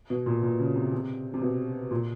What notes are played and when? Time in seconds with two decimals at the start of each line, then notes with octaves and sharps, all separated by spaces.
0.10 B2
0.26 A#2
0.43 A#2
0.60 C#3
0.76 C3
0.92 C3
1.34 C3
1.42 B2
1.91 A#2